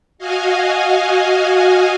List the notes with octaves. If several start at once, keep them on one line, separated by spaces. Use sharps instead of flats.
F#4 D#5 F5 G#5